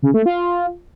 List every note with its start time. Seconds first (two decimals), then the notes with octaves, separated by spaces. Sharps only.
0.02 C#3
0.14 A3
0.26 F4